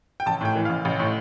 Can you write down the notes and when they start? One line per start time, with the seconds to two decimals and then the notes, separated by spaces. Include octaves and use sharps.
0.20 G5
0.26 A1 A5
0.41 A2 G5
0.55 E3
0.65 A1 F5
0.85 A1
0.99 A2